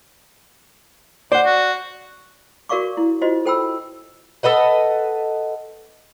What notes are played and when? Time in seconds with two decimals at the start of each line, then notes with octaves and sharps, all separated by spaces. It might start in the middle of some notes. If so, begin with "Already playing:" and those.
1.32 C5 D5 F#5
1.45 F#4
2.69 F#4 A#4 D5 F5 C#6 D6
2.97 E4
3.21 D4 F4 F#4 C5 D#5
3.45 A4 C5 G5 G#5 B5 E6
4.43 A4 B4 D#5 F#5